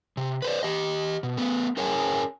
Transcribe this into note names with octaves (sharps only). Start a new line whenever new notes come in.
C3
B4 C5 D5
G4 D#5
B2
A3 B3
C#4 G#4 A#4 C#5 G#5